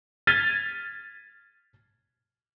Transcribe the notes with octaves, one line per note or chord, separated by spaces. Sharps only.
F6 G#6 A6 B6 D#7 G7